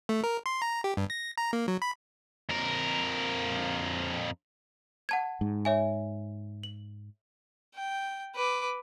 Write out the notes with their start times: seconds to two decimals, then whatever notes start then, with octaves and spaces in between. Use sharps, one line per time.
0.09 A3
0.24 A#4
0.46 C6
0.62 A#5
0.84 G4
0.97 G2
1.10 A#6
1.38 A#5
1.53 A#3
1.68 F#3
1.82 B5
2.49 F2 A#4
5.09 F#5 A5 G#6
5.41 G#2
5.65 C#5 E5 G#5
6.63 F#7
7.75 G5
8.35 B4 D6